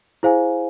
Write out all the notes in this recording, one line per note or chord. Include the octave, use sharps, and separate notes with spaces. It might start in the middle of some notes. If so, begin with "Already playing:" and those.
E4 G#4 C5 F5 G#5